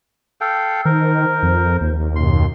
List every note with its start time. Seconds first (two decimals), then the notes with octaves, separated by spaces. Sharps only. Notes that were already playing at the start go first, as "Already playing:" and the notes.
0.41 A4 F5 G5
0.85 D#3 A#4 C5
1.43 F2
1.81 D#2
2.16 F#2 B2 C6